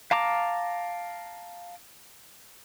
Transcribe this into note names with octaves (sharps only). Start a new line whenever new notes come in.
F5 A5 A#5 D6